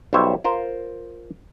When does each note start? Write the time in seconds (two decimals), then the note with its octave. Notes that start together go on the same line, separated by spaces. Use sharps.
0.13 B1 G3 F4 C5 C#5 E5
0.44 F4 A#4 C5